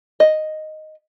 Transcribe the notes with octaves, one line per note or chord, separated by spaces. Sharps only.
D#5